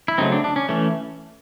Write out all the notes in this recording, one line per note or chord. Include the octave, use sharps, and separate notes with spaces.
E4
C#3 F#3 A3 C4 D#4
D4
D4
C#4
E3 A3 C#4